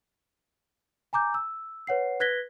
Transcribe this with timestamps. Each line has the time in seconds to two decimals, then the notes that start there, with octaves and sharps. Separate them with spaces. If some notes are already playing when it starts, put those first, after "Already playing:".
1.13 G#5 A#5 D6 G6
1.34 E6
1.87 B4 C#5 F#5 C7
2.20 B4 F#6 G#6 A#6 B6 G7